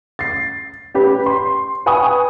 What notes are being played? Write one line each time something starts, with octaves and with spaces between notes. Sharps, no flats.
A6 C7
C#4 G4 B4
C6
B4 G5 G#5 C#6 D#6